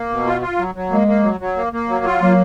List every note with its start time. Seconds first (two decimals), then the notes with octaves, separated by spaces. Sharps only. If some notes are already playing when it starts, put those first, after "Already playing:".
Already playing: A#3
0.10 B2
0.27 F4
0.42 F4
0.58 F#3
0.75 F#3
0.90 G#3 A#3
1.08 A#3
1.23 F#3
1.40 F#3
1.56 A#3
1.73 A#3
1.89 F#3
2.05 F4
2.21 F#3 A#3